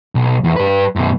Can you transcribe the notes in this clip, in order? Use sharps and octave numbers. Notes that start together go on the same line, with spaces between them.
B1
E2
G2 B4
F#2 B2